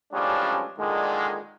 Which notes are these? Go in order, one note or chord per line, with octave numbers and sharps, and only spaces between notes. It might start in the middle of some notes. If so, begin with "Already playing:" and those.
A1 F3 G3 G#3 C#4 D4
A#2 D3 D#3 G#3